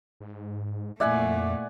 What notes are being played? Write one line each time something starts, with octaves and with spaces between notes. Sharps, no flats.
G#2
F2 A#2 A3 E4 D5 E5 F#5 G#5